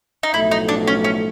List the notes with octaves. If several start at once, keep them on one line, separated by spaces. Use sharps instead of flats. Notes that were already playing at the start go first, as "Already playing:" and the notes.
D#4
B1 A2 F3 A3 E4
D#4
D4
C#4
C#4